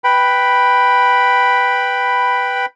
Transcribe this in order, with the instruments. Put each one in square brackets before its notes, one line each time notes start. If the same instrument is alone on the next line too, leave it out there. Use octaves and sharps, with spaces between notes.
[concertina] B4 G5 B5